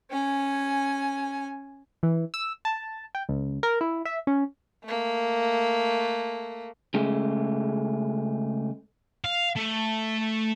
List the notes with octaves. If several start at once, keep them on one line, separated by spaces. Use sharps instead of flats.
C#4 G#5
E3
E6
A5
G5
C#2
A#4
E4
E5
C#4
A3 A#3
C#3 G#3 A3
F5
A3